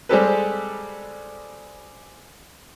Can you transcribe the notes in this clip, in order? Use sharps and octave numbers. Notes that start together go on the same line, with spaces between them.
G3 G#3 C4 G4 A4 B4